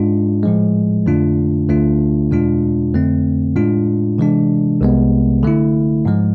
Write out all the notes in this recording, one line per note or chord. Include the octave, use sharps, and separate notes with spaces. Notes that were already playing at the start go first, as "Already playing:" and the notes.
Already playing: G#2 G#3 D4 F4
A2 F3 G#3
F2 D3 A3 D4 F4
D2 D3 A3 D4 F4
E2 B2 G#3 D4 F4
F2 D3 A3 C4
A2 G#3 D4 F4
C3 E3 G#3 D4
C2 C3 G#3 B3
D3 A3 E4
G#2 F3 G#3